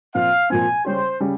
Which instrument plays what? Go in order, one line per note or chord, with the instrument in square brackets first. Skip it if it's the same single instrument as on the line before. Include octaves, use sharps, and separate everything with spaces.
[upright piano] A#2 F3 C4 [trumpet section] F5
[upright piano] A#2 F3 C4 [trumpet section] G#5
[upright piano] C#3 G3 C#4 G4 [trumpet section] C5
[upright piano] C#3 G3 C#4